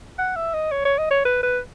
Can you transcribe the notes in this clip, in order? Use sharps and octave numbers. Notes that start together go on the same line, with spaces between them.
F#5
E5
D#5
C#5
C#5
D#5
C#5
B4
B4